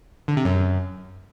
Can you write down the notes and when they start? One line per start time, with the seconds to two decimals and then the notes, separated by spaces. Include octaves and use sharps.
0.28 D3
0.37 C3
0.45 F#2